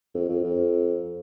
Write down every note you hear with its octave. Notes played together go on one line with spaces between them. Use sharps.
F2
F2
F2